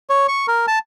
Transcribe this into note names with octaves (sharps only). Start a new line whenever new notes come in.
C#5
C#6
A#4
A5